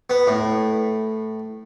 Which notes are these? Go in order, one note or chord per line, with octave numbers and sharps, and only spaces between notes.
B3
A2